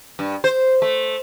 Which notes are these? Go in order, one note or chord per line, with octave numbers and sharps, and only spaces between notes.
G2
C5
A3